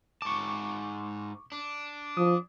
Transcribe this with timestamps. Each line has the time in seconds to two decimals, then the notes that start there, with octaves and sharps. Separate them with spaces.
0.22 G#2 A5 C#6 D6
1.52 D4
2.17 F3 D#6